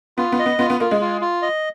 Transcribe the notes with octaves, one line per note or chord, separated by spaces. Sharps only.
B3 F4
B3
D#5
B3
B3 F4
B3
A#3 F4
G#3
F4
F4
D#5